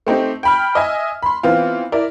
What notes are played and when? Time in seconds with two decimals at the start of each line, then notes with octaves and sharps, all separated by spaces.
0.07 A3 C4 D#4 G4
0.43 G5 B5 F6
0.75 D#5 E5 G#5 D#6
1.23 B5 C6
1.43 E3 B3 C4 F4
1.92 E4 A#4 D5